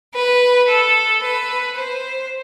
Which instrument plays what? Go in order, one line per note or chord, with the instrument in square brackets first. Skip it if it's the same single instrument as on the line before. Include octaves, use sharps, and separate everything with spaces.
[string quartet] B4
A4
B4
C5